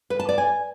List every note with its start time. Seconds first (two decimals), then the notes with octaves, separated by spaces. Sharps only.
0.10 B4
0.20 A5
0.29 D5
0.38 G#5